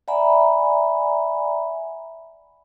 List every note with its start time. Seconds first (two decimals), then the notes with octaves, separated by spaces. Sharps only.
0.08 D5 E5 F#5 G#5 A#5 B5